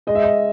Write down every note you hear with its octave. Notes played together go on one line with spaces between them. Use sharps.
G#3 D#5
E5
D#5